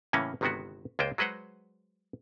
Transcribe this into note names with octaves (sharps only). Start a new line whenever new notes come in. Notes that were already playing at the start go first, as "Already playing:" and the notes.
A2 C#3 E3 A#3 C#4
G1 C3 D#3 G#3 B3 F#4
C#2 G#3 A#3 F4 C5 G5
F#3 G#3 B4 C5 F#5